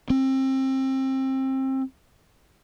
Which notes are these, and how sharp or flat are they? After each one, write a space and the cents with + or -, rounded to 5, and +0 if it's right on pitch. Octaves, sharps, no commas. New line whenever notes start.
C4 +25